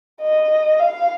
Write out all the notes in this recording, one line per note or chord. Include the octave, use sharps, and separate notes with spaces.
D#5
F5